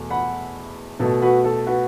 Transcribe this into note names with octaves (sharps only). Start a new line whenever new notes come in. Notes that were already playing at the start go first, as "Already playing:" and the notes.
Already playing: E2 B2 A3
F#5 B5
B2 A3 A4
F#4 B4
A4
F#4 B4